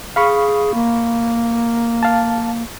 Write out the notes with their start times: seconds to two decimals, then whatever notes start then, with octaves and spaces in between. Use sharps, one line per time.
0.16 G#4 F5 B5 C#6
0.74 A#3
2.03 F5 A5